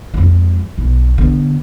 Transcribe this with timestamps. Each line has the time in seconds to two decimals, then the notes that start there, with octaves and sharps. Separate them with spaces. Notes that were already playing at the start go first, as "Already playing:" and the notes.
0.14 F2 G#3
0.78 B1
1.18 D3 B3